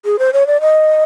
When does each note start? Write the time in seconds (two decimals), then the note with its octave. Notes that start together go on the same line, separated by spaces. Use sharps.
0.05 G#4
0.19 C5
0.33 C#5
0.47 D5
0.61 D#5